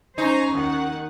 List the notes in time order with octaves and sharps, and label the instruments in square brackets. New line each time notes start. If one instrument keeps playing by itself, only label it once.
[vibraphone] C#4 C#6 [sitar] D#4 [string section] C5 G#5 A#5
[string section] D#2 D#3 F#5